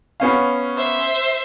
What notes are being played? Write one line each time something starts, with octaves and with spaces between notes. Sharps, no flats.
B3 C#4 F5
C5 E5